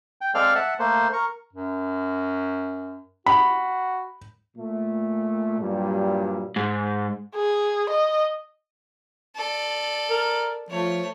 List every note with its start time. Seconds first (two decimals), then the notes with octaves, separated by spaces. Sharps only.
0.21 G5
0.35 G#3 C4 A4 D5 F5 F6
0.55 E5 F#5 A5
0.79 A3 A#3 C5
1.13 A#4 C#6
1.53 F#2
3.26 F#4 B5
4.57 A#2 A3
5.59 G2 A#2 F#3 G3
6.56 G#2
7.35 G#4
7.90 D#5
9.36 A4 D5
10.10 A#4
10.70 F3 A3 C#5